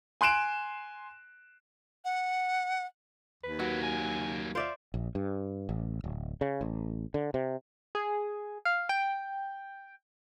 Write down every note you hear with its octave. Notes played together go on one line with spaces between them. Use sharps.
G#5 C6 F#6 D7 E7
F#5
D#2 B4
F#3 A#3 F#4
G#5
F4 C5 D5 E5
A#1
G2
A1
D1
C#3
A1
D3
C3
G#4
F5
G5